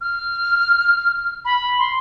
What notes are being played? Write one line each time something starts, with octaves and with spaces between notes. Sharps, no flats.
F6
B5
C6